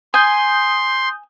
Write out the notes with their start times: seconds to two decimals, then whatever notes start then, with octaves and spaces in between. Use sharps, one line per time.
0.14 G#5 C6 D#6 G6